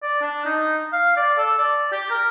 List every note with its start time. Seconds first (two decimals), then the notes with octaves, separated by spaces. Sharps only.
0.03 D5
0.21 D4
0.46 D#4
0.93 F5
1.17 D5
1.38 A4
1.58 D5
1.92 G4
2.10 A#4